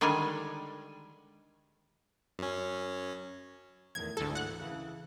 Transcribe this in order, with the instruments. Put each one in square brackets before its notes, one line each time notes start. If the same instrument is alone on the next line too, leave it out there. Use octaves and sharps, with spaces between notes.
[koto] D3 D#3 G3 G#3 G#5
[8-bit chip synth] F#2 C#4
[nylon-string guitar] E2 A2 D#3 [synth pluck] G#6
[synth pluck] D2 A4 [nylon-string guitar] G#2 E3
[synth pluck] F#5 F#6
[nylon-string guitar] C#3 E3